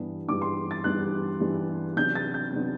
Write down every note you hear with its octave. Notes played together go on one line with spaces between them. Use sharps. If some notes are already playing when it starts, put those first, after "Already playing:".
Already playing: G2 E3 G3 B3 D4
G2 E3 G3 B3 D4 D6
C6
A6
G2 E3 G3 B3 D4 F#6
G2 E3 G3 B3 D4
C3 F#3 B3 D4 G6
A6
G6
C3 F#3 B3 D4